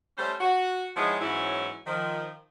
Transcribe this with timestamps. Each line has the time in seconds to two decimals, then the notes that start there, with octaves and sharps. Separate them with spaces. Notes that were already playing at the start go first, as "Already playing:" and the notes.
0.18 G3 A3 C#4 C5
0.41 F#4
0.96 F3 G#3 B3 D#4 E4 C#5
1.21 G#2 E3 F#3 C#4 E4
1.87 D#3 F3